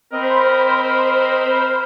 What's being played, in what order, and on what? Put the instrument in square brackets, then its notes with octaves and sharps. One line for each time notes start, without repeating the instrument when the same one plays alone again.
[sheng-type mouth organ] C4 D#5 [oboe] A#4 [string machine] C5 B5